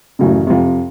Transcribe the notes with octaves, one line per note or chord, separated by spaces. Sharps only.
A1 F#2 C#3
F2 C3